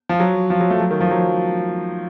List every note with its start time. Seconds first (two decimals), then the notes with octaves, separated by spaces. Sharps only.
0.09 F3
0.20 F#3
0.50 F3
0.61 F#3
0.70 A3
0.80 F#3
0.91 D#3
1.01 F3
1.11 F#3